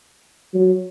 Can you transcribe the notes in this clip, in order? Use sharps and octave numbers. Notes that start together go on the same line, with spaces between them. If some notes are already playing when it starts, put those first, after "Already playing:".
F#3